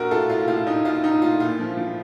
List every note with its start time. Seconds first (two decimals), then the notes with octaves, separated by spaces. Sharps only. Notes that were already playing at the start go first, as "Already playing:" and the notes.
Already playing: A#1 F#4 A#4
0.11 A2 F4 A4
0.30 A2 F4
0.48 A2 F4
0.67 A#1 D#4
0.84 A#1 F4
1.04 A#1 D#4
1.22 A2 F4
1.40 A#2 F4
1.60 F3
1.77 F3